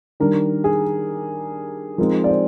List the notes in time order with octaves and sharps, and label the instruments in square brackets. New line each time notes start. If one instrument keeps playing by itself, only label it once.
[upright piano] D#3 G3 D4 A#4
G#4
F3 G#3 C4 D#4 A#4
D5
C5